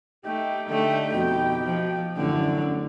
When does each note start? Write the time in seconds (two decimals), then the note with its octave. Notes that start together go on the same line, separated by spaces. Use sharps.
0.25 A3 D#4 G4 G5
0.69 D3 A3
1.14 F2 B2
1.64 F3
2.17 A1 F#2 D3